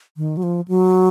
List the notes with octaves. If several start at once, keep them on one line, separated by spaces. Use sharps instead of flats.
D#3
F#3
F3
F#3